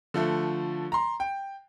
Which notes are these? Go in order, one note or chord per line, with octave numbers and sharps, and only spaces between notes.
D3 F3 A3
A#5 C6
G5